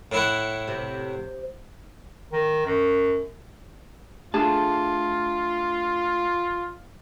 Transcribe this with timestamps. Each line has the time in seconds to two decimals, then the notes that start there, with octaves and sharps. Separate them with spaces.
0.12 A2 E4 F#5
0.68 C3
2.33 D#3
2.66 F#2
4.34 A3 D4 F4 G#4 A5